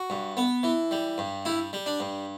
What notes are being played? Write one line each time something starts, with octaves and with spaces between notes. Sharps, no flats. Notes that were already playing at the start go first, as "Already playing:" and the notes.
Already playing: F#4
G2
B3
E3
G3
G2
G3 E4
G3
D4
G2